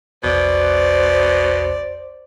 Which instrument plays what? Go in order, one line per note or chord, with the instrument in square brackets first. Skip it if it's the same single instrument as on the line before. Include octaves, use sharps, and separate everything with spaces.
[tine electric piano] A#1 E2 F#6 [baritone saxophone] B2 [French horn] C5 [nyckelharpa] D5